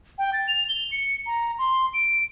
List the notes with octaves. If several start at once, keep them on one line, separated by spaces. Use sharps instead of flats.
G5
A6
F7
G7
C#7
A#5
C6
D7